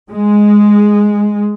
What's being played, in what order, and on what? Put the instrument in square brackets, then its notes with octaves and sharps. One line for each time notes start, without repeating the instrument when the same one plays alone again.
[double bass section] G#3